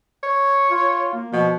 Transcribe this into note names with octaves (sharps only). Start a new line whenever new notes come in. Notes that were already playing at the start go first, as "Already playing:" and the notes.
C#5
F4
A#3
B2 F3